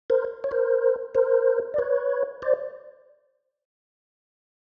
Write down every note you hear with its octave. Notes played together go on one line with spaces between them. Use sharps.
A#4 C5
C#5
A#4 C5
A#4 C5
D5
B4 C#5
C5 D5